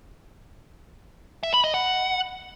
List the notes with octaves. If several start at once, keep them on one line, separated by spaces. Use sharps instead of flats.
E5
B5
D#5
F#5